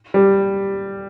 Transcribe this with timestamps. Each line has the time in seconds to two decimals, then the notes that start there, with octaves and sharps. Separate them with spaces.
0.14 G3